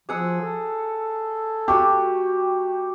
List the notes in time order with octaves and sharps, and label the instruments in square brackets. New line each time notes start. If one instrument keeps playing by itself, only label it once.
[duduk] F3 [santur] G#4 F#5 E6
[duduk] A4
[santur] A3 F#4 G4 [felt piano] G5